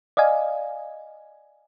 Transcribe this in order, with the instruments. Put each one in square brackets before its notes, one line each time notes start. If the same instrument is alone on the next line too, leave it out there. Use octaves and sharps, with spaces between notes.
[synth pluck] D5 D#5 F5 G#5